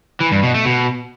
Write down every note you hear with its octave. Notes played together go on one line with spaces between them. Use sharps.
E3
G2
B2
A3
B2